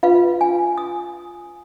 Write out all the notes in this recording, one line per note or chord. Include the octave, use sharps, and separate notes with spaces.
F4 B4 F5
G#5
D#6